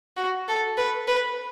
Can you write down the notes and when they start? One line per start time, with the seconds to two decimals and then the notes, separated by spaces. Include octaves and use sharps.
0.17 F#4
0.48 A4
0.77 B4
1.08 B4